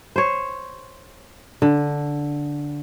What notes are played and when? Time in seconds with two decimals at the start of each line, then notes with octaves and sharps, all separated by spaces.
0.16 C5 C#5
1.62 D3